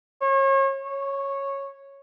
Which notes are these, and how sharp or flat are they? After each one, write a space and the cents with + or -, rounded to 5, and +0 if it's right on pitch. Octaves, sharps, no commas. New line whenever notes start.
C#5 -35
C#5 -10